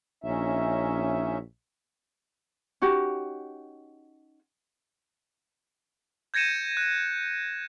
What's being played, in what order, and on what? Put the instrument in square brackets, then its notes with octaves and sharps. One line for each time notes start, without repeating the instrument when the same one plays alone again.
[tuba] A#1 [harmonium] C#4 D#4 E5
[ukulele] C#4 D#4 F#4 G4
[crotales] G6 G#6 A#6 C#7 D#7 E7
F#6